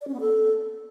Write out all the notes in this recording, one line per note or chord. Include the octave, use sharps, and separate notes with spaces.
D5
C#4
B3
A4